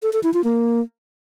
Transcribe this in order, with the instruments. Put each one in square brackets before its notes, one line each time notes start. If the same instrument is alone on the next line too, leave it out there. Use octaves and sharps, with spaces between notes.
[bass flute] A4
A4
E4
F4
A#3